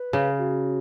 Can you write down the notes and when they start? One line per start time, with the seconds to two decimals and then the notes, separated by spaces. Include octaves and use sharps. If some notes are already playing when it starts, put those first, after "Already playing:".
Already playing: B4
0.13 C#3
0.38 F#4